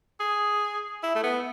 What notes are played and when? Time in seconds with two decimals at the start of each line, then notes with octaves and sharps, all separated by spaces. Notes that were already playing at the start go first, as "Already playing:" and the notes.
0.20 G#4
1.03 E4
1.16 A3
1.24 B3